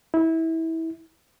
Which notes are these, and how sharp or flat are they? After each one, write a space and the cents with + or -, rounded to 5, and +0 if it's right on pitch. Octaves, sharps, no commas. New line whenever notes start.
E4 -25